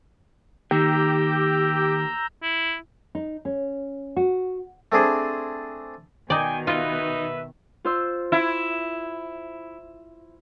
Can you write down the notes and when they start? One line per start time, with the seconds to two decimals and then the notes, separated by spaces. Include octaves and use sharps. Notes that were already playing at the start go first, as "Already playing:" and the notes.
0.71 D#3 A#3 G4 A#5 E6 G6
2.43 E4
3.15 D#4
3.45 C#4
4.17 F#4
4.92 A3 C4 D4 G#4 C5
6.30 B2 D#3 D#4 D5 G5 G#5
6.67 D#4 F4 B4 D#5 E5
7.85 F4 C5 E6
8.32 E4